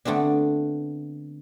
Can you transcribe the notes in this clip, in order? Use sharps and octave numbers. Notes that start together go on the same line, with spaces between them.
D3 A3 B3 C4 D4